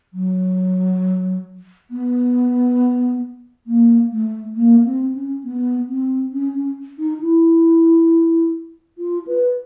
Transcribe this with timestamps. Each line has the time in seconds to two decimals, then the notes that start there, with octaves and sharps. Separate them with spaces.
0.13 F#3
1.91 B3
3.67 A#3
4.12 A3
4.55 A#3
4.85 C4
5.15 C#4
5.43 B3
5.88 C4
6.32 C#4
6.55 C#4
6.98 D#4
7.20 E4
8.98 F4
9.27 B4